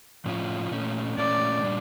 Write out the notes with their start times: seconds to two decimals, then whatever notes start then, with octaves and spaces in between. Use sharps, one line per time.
0.26 A2 F3 C#4 F4
0.71 A#2 A3 C#4
1.17 A#2 A3 C#4 D5
1.63 A#2 G3 D4